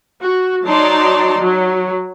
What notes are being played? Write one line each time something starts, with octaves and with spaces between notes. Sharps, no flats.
F#4
F#3 D#4 D5 A5 A#5 C6
F#3